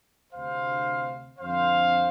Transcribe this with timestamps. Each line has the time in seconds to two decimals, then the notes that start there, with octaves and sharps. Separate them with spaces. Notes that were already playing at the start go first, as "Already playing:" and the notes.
0.33 D2 C3 C5 F5
1.39 F2 D3 C5 F5